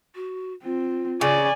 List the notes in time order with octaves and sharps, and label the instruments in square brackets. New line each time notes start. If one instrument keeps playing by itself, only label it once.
[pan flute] F#4
[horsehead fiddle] C4 [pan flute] F4
[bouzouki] C#3 [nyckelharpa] D5 [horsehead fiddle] G#5